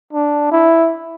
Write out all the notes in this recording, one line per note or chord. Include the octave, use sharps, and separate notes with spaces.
D4
E4